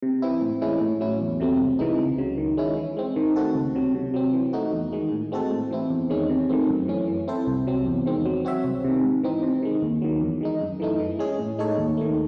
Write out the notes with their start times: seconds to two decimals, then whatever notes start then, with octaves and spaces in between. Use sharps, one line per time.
0.02 C3
0.22 E3 C4 E4
0.41 A2
0.61 E3 G#3 C#4 E4
0.81 A2
1.01 F#3 C#4 E4
1.21 E2
1.40 C3 F#3 A3 C4
1.59 C2
1.79 C3 E3 G#3 D#4
1.99 C#2
2.18 C#3 F#3
2.38 D#3
2.57 G#3 C#4 E4
2.77 E3
2.97 G#3 C4
3.16 D#3
3.36 A3 C4 F#4 A4
3.55 C#2
3.75 C3 F#3
3.95 C3
4.14 F#3 C4
4.33 E3
4.53 A3 D#4 F#4
4.73 E2
4.92 D#3 G#3
5.12 A2
5.32 G#3 C4 F#4 A4
5.51 A2
5.71 E3 C4 E4
5.90 E2
6.10 D#3 G#3 C#4
6.29 C3
6.49 D#3 A3 C4
6.69 F#2
6.88 E3 A3 C#4
7.08 E3
7.28 C4 E4 A4 C5
7.47 C2
7.67 C3 F#3 C4
7.87 E2
8.06 D#3 G#3 C4
8.25 F#3
8.45 C4 F#4 C#5 E5
8.64 C2
8.84 C3 D#3
9.04 G#2
9.23 E3 C4 D#4
9.43 C3
9.63 D#3 G#3
9.82 D#2
10.02 D#3 F#3
10.21 E2
10.41 D#3 G#3 D#4
10.61 F#2
10.80 E3 A3 D#4
11.00 E3
11.19 G#3 C#4 G#4
11.39 A2
11.59 G#3 D#4 A4 C#5
11.78 D#2
11.97 D#3 A3